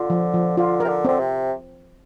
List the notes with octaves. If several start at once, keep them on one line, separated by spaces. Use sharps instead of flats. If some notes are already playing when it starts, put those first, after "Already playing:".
Already playing: D3 F4
F3
F3
D3 F4
C3 A#4
D3
D3 C4
C3